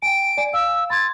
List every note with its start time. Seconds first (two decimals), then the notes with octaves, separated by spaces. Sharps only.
0.02 G5 G#5 D7
0.37 D5 G#5
0.54 F5 E6
0.90 B5 C6 G#6 A6